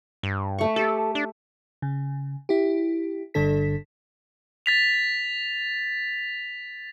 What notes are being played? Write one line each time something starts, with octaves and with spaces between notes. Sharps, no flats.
G2
A3 C#6
G4 A4
D4
C#3
E4 G4
G1 G2 D3 D4 A4 B6
A6 B6 F7